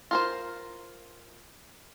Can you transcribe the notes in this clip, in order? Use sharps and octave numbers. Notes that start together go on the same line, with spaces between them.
F4 A#4 C5